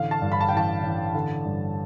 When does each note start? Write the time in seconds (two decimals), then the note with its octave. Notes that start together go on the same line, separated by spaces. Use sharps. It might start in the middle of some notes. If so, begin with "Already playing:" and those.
Already playing: A1 D3 F5
0.11 A5
0.22 G2
0.32 B5
0.41 A5
0.49 G5
0.52 A1 A5
0.83 A1
1.14 D3
1.45 G2